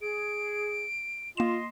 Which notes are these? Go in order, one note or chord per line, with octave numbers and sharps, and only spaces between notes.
G#4 D7
A#3 F4 D#5 C6 E7